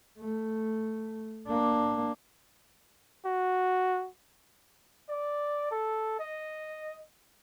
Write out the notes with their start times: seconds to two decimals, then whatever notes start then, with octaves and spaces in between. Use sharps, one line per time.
0.19 A3
1.47 A#3 D4
3.25 F#4
5.09 D5
5.71 A4
6.20 D#5